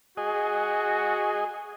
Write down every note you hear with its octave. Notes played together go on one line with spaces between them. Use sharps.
F#4 G#4 D#5